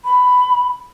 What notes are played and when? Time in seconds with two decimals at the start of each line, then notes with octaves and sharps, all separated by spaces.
0.05 B5